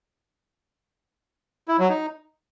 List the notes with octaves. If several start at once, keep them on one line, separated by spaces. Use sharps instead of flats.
E4
F#3
D#4